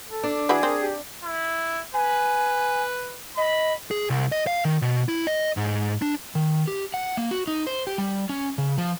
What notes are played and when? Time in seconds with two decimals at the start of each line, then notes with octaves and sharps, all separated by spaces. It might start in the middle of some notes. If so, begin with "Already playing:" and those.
0.09 A4
0.24 D4
0.49 E3 F#4 G#4 B4
0.63 C4 A#4
0.80 G4
1.24 E4
1.94 B4 G#5
3.37 D#5 B5
3.91 G#4
4.10 C2
4.32 D#5
4.47 F5
4.65 D#3
4.82 B2
5.09 E4
5.27 D#5
5.57 G#2
6.02 D4
6.35 D#3
6.68 G4
6.94 F#5
7.17 A#3
7.31 F#4
7.47 D#4
7.67 C5
7.87 G4
7.98 G3
8.29 C#4
8.58 C#3
8.78 F3